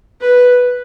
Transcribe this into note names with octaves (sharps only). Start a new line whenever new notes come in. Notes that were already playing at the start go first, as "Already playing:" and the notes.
B4